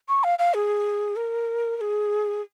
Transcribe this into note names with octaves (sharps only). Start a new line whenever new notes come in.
C#6
F5
F5
G#4
A#4
A#4
G#4